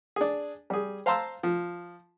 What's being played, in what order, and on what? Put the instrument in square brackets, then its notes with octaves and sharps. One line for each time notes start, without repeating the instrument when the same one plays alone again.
[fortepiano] D4 G#4
G3 G#4
C5 F5 A5 A#5 C6 E6
F3